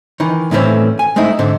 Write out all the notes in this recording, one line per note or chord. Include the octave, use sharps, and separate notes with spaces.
D#3 E3
A2 D#3 E3 A3 C4 C#4
G#5
G#3 A3 C4 D#4 E4
G#2 D3 C4